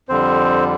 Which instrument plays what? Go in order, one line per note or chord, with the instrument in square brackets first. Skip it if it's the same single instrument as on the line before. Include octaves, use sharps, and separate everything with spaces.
[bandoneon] F2 D3 G3 C4 C5